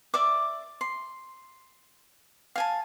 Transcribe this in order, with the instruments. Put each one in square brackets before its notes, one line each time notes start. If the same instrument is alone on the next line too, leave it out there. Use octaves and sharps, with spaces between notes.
[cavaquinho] D5 E5 D6
C6
F5 G#5 A5